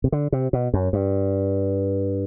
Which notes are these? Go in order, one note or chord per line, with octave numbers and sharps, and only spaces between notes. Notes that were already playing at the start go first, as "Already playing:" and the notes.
C3
D3
C3
B2
F#2
G2